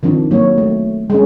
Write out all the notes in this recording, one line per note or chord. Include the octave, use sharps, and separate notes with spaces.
D#3 F3 C4 D4
F#3 A#3 F#4 C#5
A3
G#3 C#4